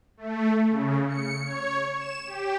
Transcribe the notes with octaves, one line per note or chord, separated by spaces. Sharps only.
A3
C#3
C#7
C#5
E7
G4